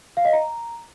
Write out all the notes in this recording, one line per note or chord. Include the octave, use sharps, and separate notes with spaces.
F5
D#5
A#5